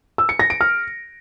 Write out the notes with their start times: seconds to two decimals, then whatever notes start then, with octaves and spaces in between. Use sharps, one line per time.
0.18 E6
0.29 C#7
0.39 A#6
0.50 D7
0.61 F6